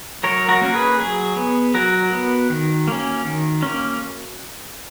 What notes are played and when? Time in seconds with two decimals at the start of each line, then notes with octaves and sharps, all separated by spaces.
0.23 F#3 A#4 C#5
0.49 F#4 A#4
0.61 A#3 C#4
0.74 G#4 B4
0.99 F#3 G#4
1.36 B3
1.74 F#3 F#4 A#4
2.12 B3
2.50 D#3
2.88 A#3 C#4
3.25 D#3
3.62 A#3 C#4